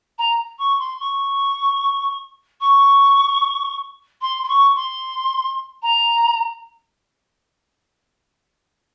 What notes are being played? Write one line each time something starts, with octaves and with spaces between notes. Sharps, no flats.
A#5
C#6
C6
C#6
C#6
C6
C6
C#6
C6
A#5